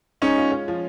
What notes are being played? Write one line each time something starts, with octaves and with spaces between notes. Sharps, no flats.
G#3 C#4 D#4
F4
C#4
F3